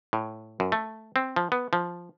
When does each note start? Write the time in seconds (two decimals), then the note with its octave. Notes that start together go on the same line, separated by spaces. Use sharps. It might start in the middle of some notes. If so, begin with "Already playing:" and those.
0.13 A2
0.60 F#2
0.72 A3
1.16 C4
1.36 F3
1.52 B3
1.73 F3